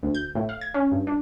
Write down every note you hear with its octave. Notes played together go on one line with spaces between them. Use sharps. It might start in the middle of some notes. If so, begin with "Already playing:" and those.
D2
G6
A2
F5
G#6
C#4
G2
D4